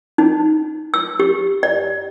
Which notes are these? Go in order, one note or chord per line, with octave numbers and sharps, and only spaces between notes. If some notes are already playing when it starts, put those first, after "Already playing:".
D#4
E6
G4
D5